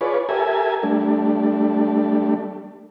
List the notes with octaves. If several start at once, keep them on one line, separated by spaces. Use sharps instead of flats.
F4 G#4 B4 C#5 D5
G4 A4 A#4 E5 G#5
G3 A3 D4